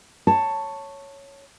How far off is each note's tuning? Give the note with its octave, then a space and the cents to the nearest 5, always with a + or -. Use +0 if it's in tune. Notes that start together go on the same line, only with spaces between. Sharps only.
C#5 +0 A5 +10